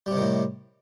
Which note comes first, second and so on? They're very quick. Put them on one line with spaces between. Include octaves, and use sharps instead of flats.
G3 C3 D#3 A2